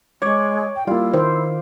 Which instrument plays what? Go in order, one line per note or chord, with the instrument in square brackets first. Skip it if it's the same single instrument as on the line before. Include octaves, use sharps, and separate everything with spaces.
[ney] G#3 [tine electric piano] C#5 C#6 G#6 [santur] D5
[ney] G5
[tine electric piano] G3 A#3 [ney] E4 [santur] F4
[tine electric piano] D#3 [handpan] C5